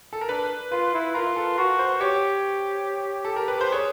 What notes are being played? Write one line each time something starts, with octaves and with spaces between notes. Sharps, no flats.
A4
A#4
D4 B4
F4 B4
E4
F4 A#4
A4
F#4 A#4
C5
G4 C#5
A4
A#4
B4
C5
G#4 C#5